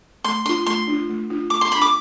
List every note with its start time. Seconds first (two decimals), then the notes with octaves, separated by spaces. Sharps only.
0.24 A3 C6
0.45 D4 F4 C6
0.66 A3 C6
0.87 D4 F4
1.09 A3
1.30 D4 F4
1.50 A3 D6
1.61 C6
1.71 D4 F4 B5
1.82 D6